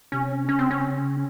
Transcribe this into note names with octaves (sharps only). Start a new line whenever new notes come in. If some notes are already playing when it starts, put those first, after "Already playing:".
C3 C#4
C#3 C#4
C4
C#4